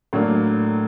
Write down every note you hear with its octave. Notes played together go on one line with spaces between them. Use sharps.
A2 F#3 A#3 D4